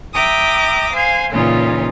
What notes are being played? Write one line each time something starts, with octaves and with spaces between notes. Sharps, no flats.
E5 G5 A#5 D6 D#6
C5 F5 G#5
A#2 C#3 E3 C#4 D#4 F4